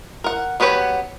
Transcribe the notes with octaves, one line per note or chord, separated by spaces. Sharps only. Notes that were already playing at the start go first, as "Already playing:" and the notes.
A#4 F#5
F#3 B3 G4 B4 C#5